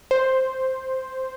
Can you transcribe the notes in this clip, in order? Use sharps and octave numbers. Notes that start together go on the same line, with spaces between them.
C5